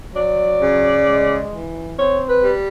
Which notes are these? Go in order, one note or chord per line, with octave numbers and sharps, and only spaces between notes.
F#3 D5
C#3
G#3
E3
C4 C#5
B4
G3